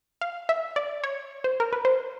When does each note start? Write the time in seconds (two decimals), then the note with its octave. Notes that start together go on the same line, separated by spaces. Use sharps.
0.21 F5
0.49 E5
0.76 D5
1.04 C#5
1.44 C5
1.60 A#4
1.73 B4
1.85 C5